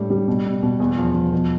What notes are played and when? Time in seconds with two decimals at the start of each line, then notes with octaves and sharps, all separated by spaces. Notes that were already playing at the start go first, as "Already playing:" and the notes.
Already playing: A2 G3 D4
0.10 G3
0.28 B2
0.45 B2
0.63 B2
0.80 E2
0.98 F3
1.15 F3
1.33 B2